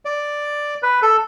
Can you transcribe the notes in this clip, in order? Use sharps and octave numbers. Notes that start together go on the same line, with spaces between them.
D5
B4
A4